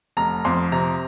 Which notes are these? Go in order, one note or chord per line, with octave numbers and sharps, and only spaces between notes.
F1 A#5
F2 C6
C3 A#5